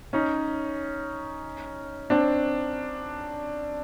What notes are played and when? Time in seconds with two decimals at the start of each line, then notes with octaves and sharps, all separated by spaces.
0.13 C#4 D#4
2.10 C4 D4